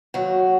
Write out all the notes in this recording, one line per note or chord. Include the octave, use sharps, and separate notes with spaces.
D#2 F#3 F#4